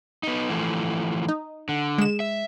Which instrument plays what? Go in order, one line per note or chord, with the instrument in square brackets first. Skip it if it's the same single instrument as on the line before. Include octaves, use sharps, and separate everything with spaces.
[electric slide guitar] B3 D#4
E3 F3 A3
[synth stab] D#4
[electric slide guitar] D3
[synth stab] G#3 E7
[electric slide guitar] E5